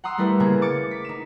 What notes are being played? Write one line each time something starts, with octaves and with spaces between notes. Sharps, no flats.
F#5 A#5 C6 D#6 E6
G3 A3 E4 A#4 B4
C#3 A#3 G#4
D6 A6 C#7
B6
D#4 E7